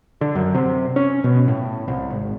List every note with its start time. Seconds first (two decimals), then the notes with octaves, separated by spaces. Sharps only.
0.21 D3
0.35 F#2
0.55 C3
0.96 C#4
1.24 B2
1.48 A2
1.88 C2
2.10 G#1